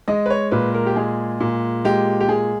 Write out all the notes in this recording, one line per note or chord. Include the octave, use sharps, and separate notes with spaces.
G#3 D#5
B4
C#5
A#2 B4
A#4
G4
G#3 G#4
A#2
G#3 G4
G4
G#3 G#4